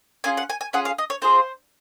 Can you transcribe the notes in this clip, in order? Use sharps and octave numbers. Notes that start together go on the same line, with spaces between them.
C#4 F4 G#4 G#5
F#5
G#5
G#5
C#4 F4 G#4 F#5
F5
D#5
C#5
C4 F4 G#4 C5